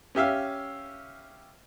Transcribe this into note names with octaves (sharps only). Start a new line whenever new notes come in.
C#4 G4 E5 F5